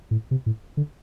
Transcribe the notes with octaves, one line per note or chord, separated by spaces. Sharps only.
A2
C3
A2
D3